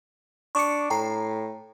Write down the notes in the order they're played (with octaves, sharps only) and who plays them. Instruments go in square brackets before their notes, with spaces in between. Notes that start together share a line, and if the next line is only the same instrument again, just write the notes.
[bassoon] D4 [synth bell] C#6 D6 C#7
[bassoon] A2 [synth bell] G5 A#5 C7